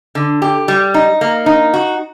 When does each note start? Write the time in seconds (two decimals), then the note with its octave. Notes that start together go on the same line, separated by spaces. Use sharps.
0.15 D3
0.42 G4
0.68 G3
0.94 D#4
1.21 A#3
1.46 D#4
1.74 F#4